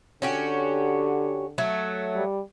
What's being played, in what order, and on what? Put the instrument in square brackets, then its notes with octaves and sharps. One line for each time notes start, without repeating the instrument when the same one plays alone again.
[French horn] D3 [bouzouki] C#4 F#4 G4
[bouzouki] F#3 A3
[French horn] G3